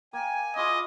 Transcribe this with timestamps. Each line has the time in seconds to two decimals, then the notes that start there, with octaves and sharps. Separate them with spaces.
0.13 A#3 G5 G#5
0.56 E4 F4 G#4 D#5 D6